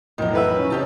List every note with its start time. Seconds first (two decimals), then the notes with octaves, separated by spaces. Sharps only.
0.18 B1 F2 A2 D#3 F#3
0.33 E3 B4 E5
0.57 C#4
0.70 F2 C#3 E3 G4 A5